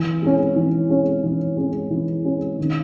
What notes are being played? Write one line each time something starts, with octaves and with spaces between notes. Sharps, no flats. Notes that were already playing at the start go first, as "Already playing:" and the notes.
Already playing: E3
G#3 C#4
E3
G#3 C#4
E3
G#3 C#4
E3
G#3 C#4
D#3